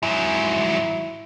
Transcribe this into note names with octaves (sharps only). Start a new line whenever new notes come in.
G#2 F#3 E4